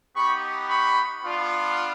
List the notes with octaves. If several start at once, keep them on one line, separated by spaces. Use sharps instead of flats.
B3 D#4 G4 B5 C#6
B5 C#6
B3 D4 F4